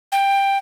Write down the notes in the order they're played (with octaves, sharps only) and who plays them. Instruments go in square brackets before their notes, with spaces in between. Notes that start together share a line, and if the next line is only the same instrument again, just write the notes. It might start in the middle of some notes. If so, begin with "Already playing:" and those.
[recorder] G5